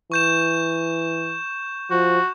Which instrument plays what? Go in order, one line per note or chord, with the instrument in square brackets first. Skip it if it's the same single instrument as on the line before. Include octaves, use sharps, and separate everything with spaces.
[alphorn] E3 [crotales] C#6 G6 E7
[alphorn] F3 [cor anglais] F#4